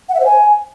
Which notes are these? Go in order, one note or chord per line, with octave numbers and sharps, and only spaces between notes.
F#5
E5
C5
G#5